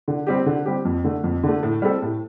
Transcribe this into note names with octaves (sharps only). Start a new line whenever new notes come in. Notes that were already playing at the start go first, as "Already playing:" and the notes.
D3
G3 C4 G4
D3
G3 C4 G4
F2
D3 A3
F2
D3 A3
A2
G3 C4 A4
A2